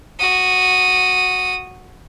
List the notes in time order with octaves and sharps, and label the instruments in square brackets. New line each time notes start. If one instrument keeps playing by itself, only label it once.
[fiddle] F#4 D#6